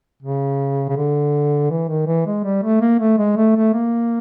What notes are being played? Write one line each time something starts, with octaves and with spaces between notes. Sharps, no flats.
C#3
C#3
D3
E3
D#3
E3
G#3
G3
A3
A#3
A3
G#3
A3
A3
A#3